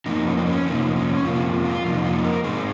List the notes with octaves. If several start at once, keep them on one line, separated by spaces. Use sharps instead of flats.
F2 C3 F3 A#3 D#4
C#4
D#4
C#4
F2 C3 F3 A#3 D#4
C#4
F2 C3 F3 A#3 F4
F4
F2 C3 F3 A#3 D#4
D#4
A#4
G#2 D#3 G#3 C4 G#4